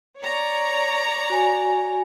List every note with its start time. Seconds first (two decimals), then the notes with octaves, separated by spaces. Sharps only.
0.20 C#5 D5 A#5
1.30 F#4 G#5